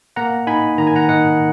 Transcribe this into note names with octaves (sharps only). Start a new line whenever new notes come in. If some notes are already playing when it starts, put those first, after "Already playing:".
A#3 F#5 A#5
D#4 G#5 B5
D#3 A#5
G#5
F#5 A#5
D#3 D#5 F#5